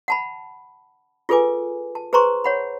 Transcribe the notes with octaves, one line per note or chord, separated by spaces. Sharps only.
F#5 A5 B5
F4 G#4 A4 B4 G#5 D6
A5
G#4 B4 C5 A#5 C6 C#6
C#5 F#5 B5